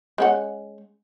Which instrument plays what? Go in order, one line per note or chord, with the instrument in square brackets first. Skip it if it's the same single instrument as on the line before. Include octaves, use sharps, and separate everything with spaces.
[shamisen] G#3 C#4 F#5